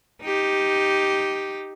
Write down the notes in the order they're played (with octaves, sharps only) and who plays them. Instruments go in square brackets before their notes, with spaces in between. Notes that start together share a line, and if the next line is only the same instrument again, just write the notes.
[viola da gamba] D#4 G4